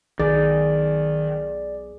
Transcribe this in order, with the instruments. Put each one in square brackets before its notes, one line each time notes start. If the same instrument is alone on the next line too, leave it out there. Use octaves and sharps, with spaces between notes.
[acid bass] B1 [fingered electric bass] D#3 [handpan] G#4 [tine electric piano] D5